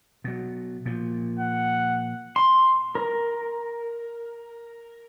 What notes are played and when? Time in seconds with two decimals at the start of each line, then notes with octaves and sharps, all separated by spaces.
0.24 B2 F#3
0.86 A#2 F3
1.39 F#5
2.36 C6
2.95 A#4